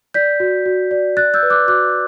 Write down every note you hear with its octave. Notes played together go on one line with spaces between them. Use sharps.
D5 G6 B6
F#4
F#4
D5
D5 F#6 A6
E6 G6
B4
D6 F#6
F#4 D6 F#6